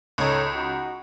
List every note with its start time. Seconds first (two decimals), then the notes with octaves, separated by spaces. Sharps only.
0.18 C#2 D#4 A4 C#5
0.53 D#4 F#4